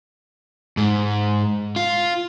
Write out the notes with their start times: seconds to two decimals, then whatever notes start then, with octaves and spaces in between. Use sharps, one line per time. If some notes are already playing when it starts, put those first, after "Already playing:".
0.77 G#2
1.76 F4